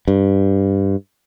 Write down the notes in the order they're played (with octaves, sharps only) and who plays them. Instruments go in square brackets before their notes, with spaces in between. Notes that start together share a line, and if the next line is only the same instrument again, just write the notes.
[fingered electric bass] G2